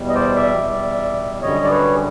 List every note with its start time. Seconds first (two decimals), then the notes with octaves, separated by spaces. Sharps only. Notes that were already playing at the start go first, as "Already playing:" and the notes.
Already playing: E2 B2 G3
0.09 D#5
0.15 C5 D5
0.36 D5 E5
0.57 E2 B2 G3
1.42 F#2 D3 G3 C#5 D#5
1.64 D5
1.71 B4 C#5
1.95 G#4